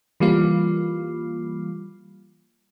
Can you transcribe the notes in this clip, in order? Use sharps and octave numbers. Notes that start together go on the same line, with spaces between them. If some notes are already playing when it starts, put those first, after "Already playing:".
E3 G3 A#3 F4